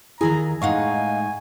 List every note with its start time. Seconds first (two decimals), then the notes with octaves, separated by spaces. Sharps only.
0.21 D#2 D#3 E4 G#4 G#5 A#5
0.62 A2 G#3 D#4 D#5 F5 F#5 G#5 C#6